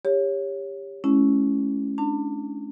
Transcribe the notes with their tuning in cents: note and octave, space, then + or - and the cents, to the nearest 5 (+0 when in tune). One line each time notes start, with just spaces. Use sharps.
G4 +25 C#5 +0
G#3 +45 C#4 +0 E4 +0
D4 +0 A5 +40